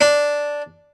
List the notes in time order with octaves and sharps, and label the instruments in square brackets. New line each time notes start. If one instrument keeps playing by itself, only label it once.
[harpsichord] D4